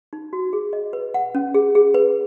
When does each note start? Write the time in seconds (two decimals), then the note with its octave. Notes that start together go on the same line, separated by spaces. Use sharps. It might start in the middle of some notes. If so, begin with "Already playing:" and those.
0.13 D#4
0.33 F#4
0.53 G#4
0.73 D#5
0.93 B4
1.14 F#5
1.35 C#4
1.54 G#4
1.75 G#4
1.94 B4